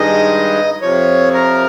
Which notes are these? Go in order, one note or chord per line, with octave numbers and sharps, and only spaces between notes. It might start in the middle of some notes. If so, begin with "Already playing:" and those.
Already playing: G2 D#3 G#3 D#5
F2 C3 F3 C#5
A#4